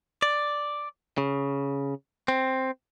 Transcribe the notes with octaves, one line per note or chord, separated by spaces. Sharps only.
D5
C#3
C4